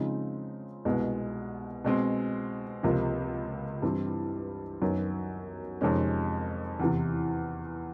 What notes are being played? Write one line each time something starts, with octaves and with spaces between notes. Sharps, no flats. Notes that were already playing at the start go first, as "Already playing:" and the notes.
Already playing: C#3 F3 G#3 C4 D#4
C2 B2 G#3 B3
B2 G#3 C4
C#2 C3 F3 A#3
G2 E3 G3 C4
F#2 D#3 F#3 B3
F2 C3 D#3 G#3 C#4
E2 C3 E3